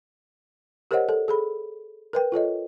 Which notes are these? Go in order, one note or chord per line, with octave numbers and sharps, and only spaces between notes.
G4 A#4 C5 C#5 D#5 F#5
A4
G#4 A4 B5
A#4 B4 G5
F4 A4 C#5 D#5